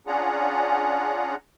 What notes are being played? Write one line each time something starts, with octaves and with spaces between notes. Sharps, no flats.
C#4 D4 F4 G#4 F#5 A#5